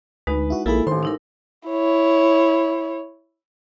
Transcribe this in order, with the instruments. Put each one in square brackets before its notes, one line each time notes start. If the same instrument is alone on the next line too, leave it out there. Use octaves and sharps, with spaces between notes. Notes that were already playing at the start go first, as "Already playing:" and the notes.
[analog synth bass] D2 [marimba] G#3 D#4 [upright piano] B4
[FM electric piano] E4 F#4
[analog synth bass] A#1 [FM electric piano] A#3 F4 G#4 [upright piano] E4 B5 [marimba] A4
[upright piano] A1 C6 [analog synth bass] D#3 [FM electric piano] C5
[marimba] D#4 E4 A#4
[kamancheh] E4 C#5